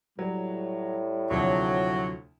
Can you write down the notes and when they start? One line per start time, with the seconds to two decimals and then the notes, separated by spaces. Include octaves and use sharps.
0.19 A2 F#3 G3
1.31 D2 C3 F3 F#3